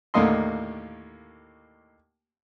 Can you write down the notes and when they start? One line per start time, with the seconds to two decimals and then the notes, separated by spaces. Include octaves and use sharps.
0.14 D#2 A2 D3 A#3 D#5 C6